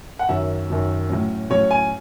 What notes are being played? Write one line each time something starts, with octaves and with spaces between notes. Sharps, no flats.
F#5
F#2 D#3 F#3 E5
F#2 D#3 F#3
A2 F#3 C#4
A2 F#3 C#4 C#5
G#5